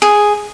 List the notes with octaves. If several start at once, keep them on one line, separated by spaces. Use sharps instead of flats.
G#4